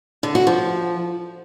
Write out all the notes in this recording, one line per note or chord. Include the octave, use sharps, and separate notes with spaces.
D3
F#4
F3